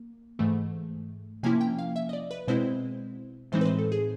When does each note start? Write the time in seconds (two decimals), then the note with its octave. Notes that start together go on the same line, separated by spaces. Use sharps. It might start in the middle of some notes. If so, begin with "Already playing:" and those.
Already playing: A#3
0.39 G#2 E3 A3
1.43 C3 F3 A#3 C#4 E4 G#5
1.61 G5
1.79 F5
1.96 E5
2.09 D#5
2.13 D5
2.31 B4
2.48 B2 G#3 C4 E4 C5
3.52 A2 E3 G#3 C4 D#4 C5
3.61 B4
3.65 C5
3.79 A4
3.92 G#4